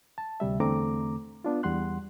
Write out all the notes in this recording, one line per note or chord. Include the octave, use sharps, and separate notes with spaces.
A5
D2 C3 G3 E5
E2 D3 A3 C4 A#5 D6
B3 D4 F4
E2 G3 F#5 C6 F#6